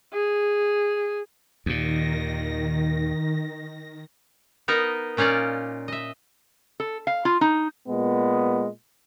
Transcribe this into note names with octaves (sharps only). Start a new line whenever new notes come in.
G#4
D#2 A#2 D#3 A#6
B3 D#4 A#4 D#5
A#2 C#4 D#4 F4 D5
D#5 E5
A4
F5
F4
D#4
A#2 G#3 B3